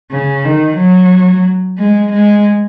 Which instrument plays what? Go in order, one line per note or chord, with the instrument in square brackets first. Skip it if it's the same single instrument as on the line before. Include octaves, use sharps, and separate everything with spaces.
[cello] C#3
D#3
F#3
G#3
G#3